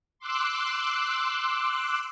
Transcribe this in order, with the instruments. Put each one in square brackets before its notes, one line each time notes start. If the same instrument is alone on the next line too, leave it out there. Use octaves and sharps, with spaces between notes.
[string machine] C6 D6 E6 F#6